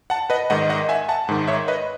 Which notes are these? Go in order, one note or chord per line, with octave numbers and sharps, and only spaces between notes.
F#5 A5
B4 D#5
G#2 D#3 D#5 F#5
D#5 F#5
E5 G#5
F#5 A5
G#2 D#3
C#5 E5
B4 D#5